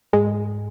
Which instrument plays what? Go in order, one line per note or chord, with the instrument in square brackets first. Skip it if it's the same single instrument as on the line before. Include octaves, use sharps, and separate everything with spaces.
[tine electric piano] G#2 [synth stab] G#3